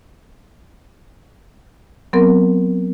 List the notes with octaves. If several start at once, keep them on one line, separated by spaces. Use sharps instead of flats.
F#3 B3 C4 A#4